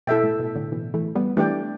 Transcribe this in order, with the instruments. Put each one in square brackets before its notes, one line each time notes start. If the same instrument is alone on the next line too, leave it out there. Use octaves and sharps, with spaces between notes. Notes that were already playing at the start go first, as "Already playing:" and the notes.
[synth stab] B2 [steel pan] E4 A4 E5 G5
[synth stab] A2
B2
A2 D3
B2 E3
E3 A3
G3 B3
[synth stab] E3 A3 [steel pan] D4 G4 D5 G5